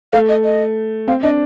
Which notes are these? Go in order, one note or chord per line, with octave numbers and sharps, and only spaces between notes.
A3 F5
D#5
D#5
C4 F5
D4 D#5